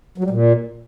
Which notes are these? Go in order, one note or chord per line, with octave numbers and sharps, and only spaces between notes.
F#3
G3
A#2